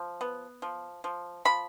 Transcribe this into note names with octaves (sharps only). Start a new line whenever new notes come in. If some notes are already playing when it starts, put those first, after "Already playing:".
Already playing: F3
B3
F3
F3
F3 B5